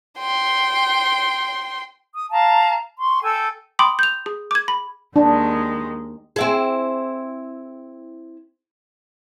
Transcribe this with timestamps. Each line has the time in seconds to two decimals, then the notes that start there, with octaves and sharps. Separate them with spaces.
0.18 G5 C6
2.12 D#6
2.30 F5 A5 A#5
2.98 C6 C#6
3.22 A4 G5 G#5 E6
3.79 G5 B5 C6 D6 D#6
3.99 G6 F7
4.26 G#4
4.51 D6 G#6
4.68 B5
5.16 D#2 D#3 G#3 D4
6.36 C4 E4 G#4